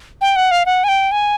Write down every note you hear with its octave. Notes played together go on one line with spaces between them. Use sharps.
G5
F#5
F5
F#5
G#5
G5
G#5